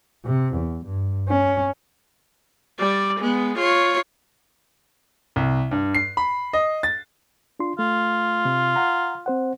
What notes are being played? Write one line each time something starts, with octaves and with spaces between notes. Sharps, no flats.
C3
E2
G2
C#4
G3 D5
G#3 B3
F4 C#5
C2
G2
C7
B5
D#5
A6
D4 F4 C6
A3 F4
C3
F#5 A#5
C4 C5 F#5